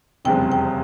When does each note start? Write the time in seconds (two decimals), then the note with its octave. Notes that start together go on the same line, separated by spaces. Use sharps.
0.25 F1 E2 C#3 G3 C4 G5
0.52 G5